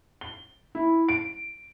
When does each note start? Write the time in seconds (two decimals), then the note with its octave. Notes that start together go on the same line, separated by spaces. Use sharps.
0.21 G7
0.75 E4
1.09 D7